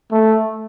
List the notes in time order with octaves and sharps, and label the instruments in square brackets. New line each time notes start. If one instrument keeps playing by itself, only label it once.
[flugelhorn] A3